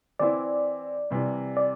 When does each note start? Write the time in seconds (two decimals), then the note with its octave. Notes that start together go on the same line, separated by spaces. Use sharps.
0.19 E3 C4 E4 D5
1.10 C3 E3 G3
1.57 D5